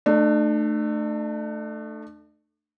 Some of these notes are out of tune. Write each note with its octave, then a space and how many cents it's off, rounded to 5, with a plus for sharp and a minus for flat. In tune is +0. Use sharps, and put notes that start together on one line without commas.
A3 +0 D4 +40